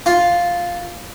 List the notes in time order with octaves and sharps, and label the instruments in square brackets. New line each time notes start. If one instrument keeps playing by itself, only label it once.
[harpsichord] F4